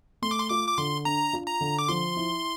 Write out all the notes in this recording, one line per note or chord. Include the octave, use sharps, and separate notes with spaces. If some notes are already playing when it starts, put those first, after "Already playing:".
A3 C6
D6
C6
F4 D6
D6
D3 C6
D4 A#5
F4
A#5
D3
D6
F3 C6
E4